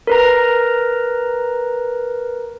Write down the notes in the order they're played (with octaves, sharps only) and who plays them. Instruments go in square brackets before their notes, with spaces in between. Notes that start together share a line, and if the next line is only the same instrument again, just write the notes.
[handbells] A#4 B4 A#5